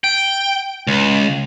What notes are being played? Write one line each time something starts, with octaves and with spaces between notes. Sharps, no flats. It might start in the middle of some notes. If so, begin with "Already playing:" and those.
G5
C#2